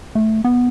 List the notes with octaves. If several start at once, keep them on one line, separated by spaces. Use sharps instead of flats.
A3
B3